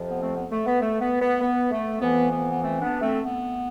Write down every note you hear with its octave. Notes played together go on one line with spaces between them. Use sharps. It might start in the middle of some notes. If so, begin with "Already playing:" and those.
Already playing: F2 C3 F3
B3
A3 C4
B3
A3
B3
A3
B3
B3
B3
A3
F2 E3 B3
B3
B3
A3 C4
B3 D4
A3 C4
B3